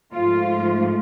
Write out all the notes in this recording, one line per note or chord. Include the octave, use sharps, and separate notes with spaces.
G#2 F3 A3 F4